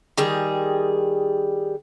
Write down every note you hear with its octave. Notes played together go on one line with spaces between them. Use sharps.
D#3 G3 G#4